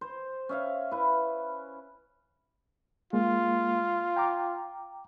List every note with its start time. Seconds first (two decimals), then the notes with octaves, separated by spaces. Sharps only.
0.01 C5
0.49 C#4 E5 F5
0.91 E4 B4
3.13 G#3 A#3 F4
4.16 G5 A#5 D6